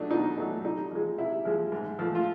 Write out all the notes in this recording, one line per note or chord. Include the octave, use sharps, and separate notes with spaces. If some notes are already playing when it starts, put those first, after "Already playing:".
Already playing: F#3 A3 D4 D#4
B2 D#4
F#3 A3
C3 D#4
F3 G#3
C3 E4
F3 G#3
G#2
F3 A3
F4